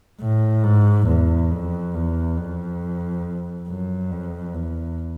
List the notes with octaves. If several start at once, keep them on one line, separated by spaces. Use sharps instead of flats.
A2
G#2
E2
F2
E2
F2
F#2
F2
E2